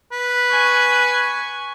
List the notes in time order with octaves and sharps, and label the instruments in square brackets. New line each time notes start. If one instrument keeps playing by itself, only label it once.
[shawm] B4
[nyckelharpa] G#5 C#6